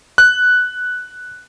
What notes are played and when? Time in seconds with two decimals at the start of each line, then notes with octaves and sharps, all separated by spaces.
0.18 F#6